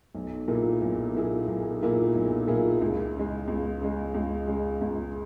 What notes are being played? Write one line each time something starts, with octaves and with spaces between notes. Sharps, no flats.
B1
A#2 A#3 E4 G#4
B1
A#2 A#3 E4 G#4
B1
A#2 A#3 E4 G#4
B1
A#2 A#3 E4 G#4
C#2
C#3 G#3
C#2
C#3 G#3
C#2
C#3 G#3
C#2